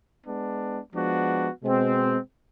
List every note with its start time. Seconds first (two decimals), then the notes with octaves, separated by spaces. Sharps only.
0.24 G#3 B3 D4
0.93 F3 G#3 B3 D4 F#4
1.63 B2 G#3 C4